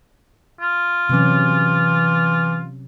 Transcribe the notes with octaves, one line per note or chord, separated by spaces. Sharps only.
F4
C3 E3 F#3 C#4